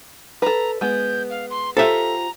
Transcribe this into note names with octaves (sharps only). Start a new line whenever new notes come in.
A4 B4 A#5
G#3 B3 G6
F5
C6
F4 G4 A4 C5 E5 A#5